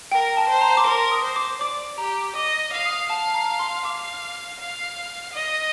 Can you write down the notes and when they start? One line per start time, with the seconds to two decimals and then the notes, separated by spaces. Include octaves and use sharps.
0.12 A#4 G5
0.37 A5
0.49 C5
0.61 A#5
0.77 D6
0.86 A#4 C6
1.11 D#6
1.24 C5
1.36 D6
1.61 D5 D6
1.98 G4 A#5
2.35 D#5 D6
2.73 F5
2.85 D#6
3.10 F5 A5
3.34 A#5
3.59 C6
3.84 F5 D6
4.60 F5
5.33 D#5